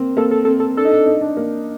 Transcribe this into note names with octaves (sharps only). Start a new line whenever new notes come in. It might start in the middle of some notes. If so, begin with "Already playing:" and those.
Already playing: A#3 C4
A#3 A4
A4
C4 A4
A4
D4 A4
D#4
D4
D#4
D4
A#3